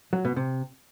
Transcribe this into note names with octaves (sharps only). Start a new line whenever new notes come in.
F#3
B2
C3